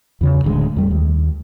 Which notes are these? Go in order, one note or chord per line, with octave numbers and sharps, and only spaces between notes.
E2 C#3
D1 A1 D2 G#3
F2 G3 A3
D#2